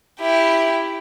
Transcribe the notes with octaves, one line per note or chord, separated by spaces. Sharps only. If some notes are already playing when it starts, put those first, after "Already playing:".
E4 G4